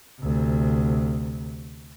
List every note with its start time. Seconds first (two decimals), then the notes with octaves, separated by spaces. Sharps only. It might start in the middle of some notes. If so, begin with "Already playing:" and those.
0.20 D2 C3